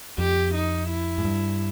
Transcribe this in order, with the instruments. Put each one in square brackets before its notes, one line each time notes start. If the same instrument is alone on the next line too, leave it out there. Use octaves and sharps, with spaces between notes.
[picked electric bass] F2 [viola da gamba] G4
[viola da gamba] D#4
E4
[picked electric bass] G#2
G2